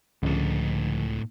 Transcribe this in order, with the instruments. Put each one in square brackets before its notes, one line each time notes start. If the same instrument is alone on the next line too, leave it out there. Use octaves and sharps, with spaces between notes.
[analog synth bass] C#2 [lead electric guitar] A2 D#5 [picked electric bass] D3 F3